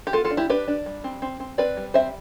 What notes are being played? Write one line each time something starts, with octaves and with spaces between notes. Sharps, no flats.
G4
B3 F4 A4
F4 A4
D4
E4 G4
D4 G4 B4
D4
G3
C4
C4
C4
C4 B4 D5
G3
C4 C5 E5